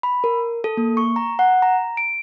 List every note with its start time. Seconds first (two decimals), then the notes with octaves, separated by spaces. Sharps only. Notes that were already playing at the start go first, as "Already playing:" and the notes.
0.03 B5
0.24 A#4
0.64 A4
0.77 A#3
0.97 C#6
1.16 A#5
1.39 F#5
1.62 A#5
1.97 D7